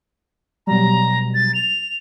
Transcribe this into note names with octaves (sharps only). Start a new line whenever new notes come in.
B2 F#3 G3 A#5
A6
F7